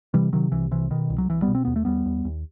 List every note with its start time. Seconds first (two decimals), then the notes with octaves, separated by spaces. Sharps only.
0.14 C3 E3 G3
0.33 C3 D#3 F#3
0.52 C2 E3
0.71 C3 E3
0.91 B2 D#3
1.10 C2
1.18 F#3
1.29 C2 E3
1.42 G3 B3
1.48 B2
1.55 C4
1.65 D#2 B3
1.76 A3
1.85 D#2 G3 B3
2.06 D#2
2.25 D#2